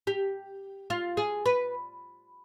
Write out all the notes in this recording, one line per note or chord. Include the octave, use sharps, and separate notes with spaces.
G4
F4
G#4
B4